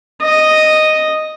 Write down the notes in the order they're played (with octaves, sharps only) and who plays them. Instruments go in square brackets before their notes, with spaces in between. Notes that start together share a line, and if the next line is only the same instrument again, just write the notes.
[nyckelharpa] D#5